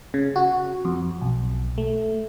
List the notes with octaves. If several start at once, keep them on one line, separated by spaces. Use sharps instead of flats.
C#3
F#4
F2
B1
A3